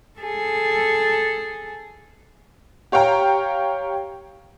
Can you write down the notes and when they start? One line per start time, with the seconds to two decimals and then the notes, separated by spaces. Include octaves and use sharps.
0.20 G#4 A4
2.92 G4 C#5 F5 G5 A#5